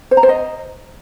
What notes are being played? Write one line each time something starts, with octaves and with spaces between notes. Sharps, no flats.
C5
A#5
C5
D#5